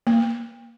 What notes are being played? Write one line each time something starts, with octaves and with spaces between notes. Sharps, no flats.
A#3